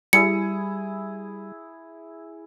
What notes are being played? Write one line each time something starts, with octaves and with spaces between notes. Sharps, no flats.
G3 E4 G#4 C#7